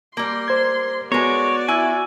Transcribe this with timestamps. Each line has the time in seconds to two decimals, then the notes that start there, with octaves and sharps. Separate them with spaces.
0.17 G3 A#3 C6
0.48 C5 G#6
1.12 G#3 B3 F#4 A#4 C#5 D5
1.68 E4 G#5